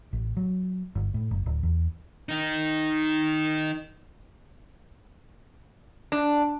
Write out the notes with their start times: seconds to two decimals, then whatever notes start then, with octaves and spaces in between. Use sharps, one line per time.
0.13 A1
0.37 F#3
0.95 G1
1.14 A2
1.31 F#1
1.46 D1
1.63 E2
2.29 D#3 D#4
6.12 D4